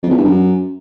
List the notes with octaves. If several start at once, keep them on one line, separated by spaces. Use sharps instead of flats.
F2
E2
G2
F#2